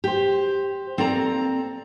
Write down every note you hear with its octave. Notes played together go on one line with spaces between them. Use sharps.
G4 C5
A#3 C4 A4 D5 G#5 A#5